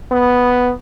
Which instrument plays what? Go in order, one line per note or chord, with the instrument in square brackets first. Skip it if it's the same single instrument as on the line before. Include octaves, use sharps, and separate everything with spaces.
[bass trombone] B3